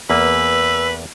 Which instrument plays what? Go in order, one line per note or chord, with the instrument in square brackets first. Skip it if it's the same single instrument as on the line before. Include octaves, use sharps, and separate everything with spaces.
[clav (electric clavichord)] E2 A#3 G#5 [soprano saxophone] B4 [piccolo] E6